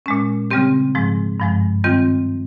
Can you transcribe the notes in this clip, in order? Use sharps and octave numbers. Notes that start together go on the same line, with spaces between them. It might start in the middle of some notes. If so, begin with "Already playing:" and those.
A#2 G#3 C#4
C#3 G3 C4 G4
G#2 F3 G#3
G2 F3 G#3
D#3 G3 C4 F4